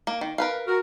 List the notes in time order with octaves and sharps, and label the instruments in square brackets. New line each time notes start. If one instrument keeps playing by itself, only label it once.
[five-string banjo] A#3
D#3
A#4 B4 F5
[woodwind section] F#4 A#4